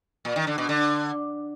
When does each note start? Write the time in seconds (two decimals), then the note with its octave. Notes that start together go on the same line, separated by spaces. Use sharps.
0.25 A#2
0.36 D#3
0.47 D3
0.58 B2
0.69 D3